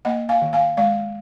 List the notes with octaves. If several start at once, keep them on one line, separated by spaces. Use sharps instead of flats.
A#3 D#5 F#5
F5 G#5
D#3
F5 G#5
G#3 D5 F5